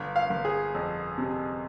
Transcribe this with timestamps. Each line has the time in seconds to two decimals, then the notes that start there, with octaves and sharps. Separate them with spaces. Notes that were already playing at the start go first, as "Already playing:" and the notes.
Already playing: G1
0.16 F5
0.30 G1
0.45 G#4
0.75 F2
1.18 C3